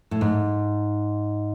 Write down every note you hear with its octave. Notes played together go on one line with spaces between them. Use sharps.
A2
G#2